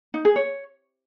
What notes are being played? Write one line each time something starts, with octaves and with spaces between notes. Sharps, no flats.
D#4
G#4
C#5